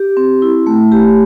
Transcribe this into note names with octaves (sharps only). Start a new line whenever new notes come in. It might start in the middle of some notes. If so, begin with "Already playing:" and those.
Already playing: G4
C4
E4
A3
G4